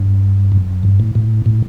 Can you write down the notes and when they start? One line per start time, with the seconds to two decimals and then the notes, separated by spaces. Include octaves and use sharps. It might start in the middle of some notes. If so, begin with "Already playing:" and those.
Already playing: G2
0.52 F#2
0.83 G2
1.00 A2
1.15 A2
1.46 A2